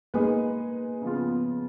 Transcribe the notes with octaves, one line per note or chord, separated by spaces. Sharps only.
G#3 A#3 D#4 G#4 B4
C#3 F3 B3 F4